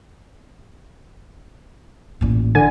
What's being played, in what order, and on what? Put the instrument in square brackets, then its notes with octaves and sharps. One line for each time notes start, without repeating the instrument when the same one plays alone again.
[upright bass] A1 A#2
[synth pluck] D3 G#5